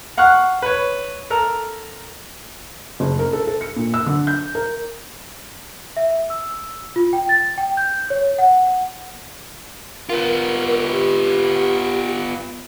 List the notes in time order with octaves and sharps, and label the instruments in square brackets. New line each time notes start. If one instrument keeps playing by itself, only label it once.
[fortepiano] F5 F#5 C#6 F6 F#6
B4 C#5
A4 A#4 A#5
[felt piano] F#1
A#4
A4
A4
C#7
A#2
E6
D3
G6
A#4
[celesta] E5
E6
F4
G5
A6
G5
G6
C#5
F#5
[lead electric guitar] B3 F4 [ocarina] A#4
[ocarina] G4